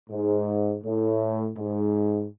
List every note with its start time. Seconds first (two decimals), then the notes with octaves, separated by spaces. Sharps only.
0.10 G#2
0.84 A2
1.58 G#2